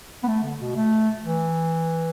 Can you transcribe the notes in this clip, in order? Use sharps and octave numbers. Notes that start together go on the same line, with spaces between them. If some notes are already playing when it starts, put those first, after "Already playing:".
B3
A3
D3
B2
A3
E3